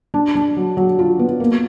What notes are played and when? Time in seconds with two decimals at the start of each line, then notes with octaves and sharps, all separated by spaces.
0.14 D4
0.35 D4
0.56 F#3
0.77 F#3
0.99 F4
1.19 B3
1.40 A#3